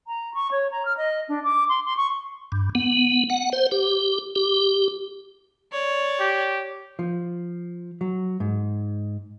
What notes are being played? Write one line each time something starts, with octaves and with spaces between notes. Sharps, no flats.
A#5
C#6
C#5
A#5
F6
D#5
D4
D6
C6
C6
C#6
G2
B3
F#5
C5
G4
G4
C#5 D5
G4
F3
F#3
G#2